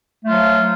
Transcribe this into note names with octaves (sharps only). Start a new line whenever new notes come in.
F3 F#3 A3 F4